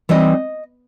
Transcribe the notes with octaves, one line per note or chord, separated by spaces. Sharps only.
E3 G3 C4 D#4 D#5